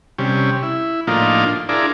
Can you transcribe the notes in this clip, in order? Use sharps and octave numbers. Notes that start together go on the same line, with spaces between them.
C3 G3 C#4
E4
A2 F3 A#3 D4 D#4 F4
D4 E4 F4 G#4 A#4 D5